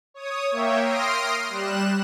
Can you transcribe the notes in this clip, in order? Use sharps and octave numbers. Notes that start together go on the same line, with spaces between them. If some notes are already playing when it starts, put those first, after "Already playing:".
C#5 D#6
A#3 C#5 E5 G5
C6 D#6 F6 A#6 C7 D7
G3 F#6 E7